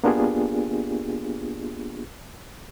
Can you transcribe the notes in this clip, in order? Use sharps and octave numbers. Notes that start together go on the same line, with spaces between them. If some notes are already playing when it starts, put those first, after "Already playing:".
A#3 B3 D4 F4 G4 G#4